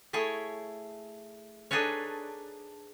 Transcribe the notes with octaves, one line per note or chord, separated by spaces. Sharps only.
A3 E4 G#4 C#5
D4 D#4 G#4 A4 B4 C#5